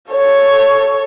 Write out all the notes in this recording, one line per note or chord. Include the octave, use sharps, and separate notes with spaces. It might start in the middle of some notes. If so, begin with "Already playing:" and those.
A4 C#5